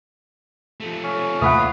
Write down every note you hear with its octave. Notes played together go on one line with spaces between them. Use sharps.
F3 A3
C#4
D#2 C3 E3 A3 F4 F#5 B5 D#6